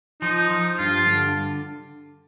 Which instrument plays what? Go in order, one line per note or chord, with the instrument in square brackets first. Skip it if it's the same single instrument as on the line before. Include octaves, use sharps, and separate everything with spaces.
[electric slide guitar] F3 [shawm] D#4
[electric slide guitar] F3
[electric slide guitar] G2 [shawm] F4
[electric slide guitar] D3